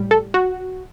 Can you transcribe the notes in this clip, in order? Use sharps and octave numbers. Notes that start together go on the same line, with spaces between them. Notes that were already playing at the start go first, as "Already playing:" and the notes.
Already playing: A2 G3
A4
F#4